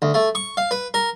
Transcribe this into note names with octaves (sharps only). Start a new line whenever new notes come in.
D2
A3
C#6
F5
B4
A#4